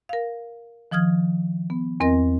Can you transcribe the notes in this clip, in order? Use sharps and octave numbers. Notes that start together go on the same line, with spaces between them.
A#4 F5
D#3 F3 D#6 F6 G#6
B3
E2 C4 A#4 D#5 A#6